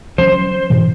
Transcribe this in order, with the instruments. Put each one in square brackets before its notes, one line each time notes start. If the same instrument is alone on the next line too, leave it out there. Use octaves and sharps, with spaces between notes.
[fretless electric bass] F3 F#3 C#4 [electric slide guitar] C5
[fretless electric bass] G#2 B2 E3